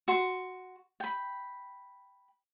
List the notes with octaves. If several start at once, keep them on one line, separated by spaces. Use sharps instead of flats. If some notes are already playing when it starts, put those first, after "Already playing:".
F#4 C6
G5 B5